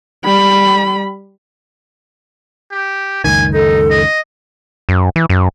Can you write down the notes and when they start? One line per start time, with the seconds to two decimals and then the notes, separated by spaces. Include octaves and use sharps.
0.25 G3 B5
2.72 G4
3.24 F#1 C#2 D#3 G#5
3.54 D#4 A4
3.90 D#5
4.89 F#2
5.16 E3
5.30 F#2